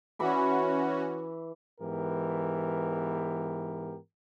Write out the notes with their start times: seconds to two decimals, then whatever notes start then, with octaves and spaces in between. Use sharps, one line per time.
0.19 E3 C#4 F#4 B5 D6
1.80 G#2 E3 B3 G4 A#4